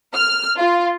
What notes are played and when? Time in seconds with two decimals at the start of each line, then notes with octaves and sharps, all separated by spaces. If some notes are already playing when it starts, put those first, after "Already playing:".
0.14 F6
0.58 F4